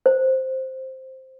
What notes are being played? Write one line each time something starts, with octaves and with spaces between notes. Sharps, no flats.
C5